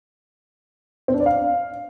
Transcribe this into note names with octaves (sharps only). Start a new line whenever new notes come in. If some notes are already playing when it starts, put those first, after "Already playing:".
C4
D4
D5
F5